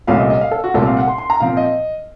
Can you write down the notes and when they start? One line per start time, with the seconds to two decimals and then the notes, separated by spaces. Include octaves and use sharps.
0.07 C2 A#2 A3 C#4 F5
0.19 D#5
0.30 D#5
0.41 F5
0.51 A4
0.64 F#4
0.74 C2 A#2 A3 C4 A4
0.85 F5
0.97 F#5
1.08 C6
1.18 C6
1.30 A#5
1.40 A#2 F3 C4 F5
1.57 D#5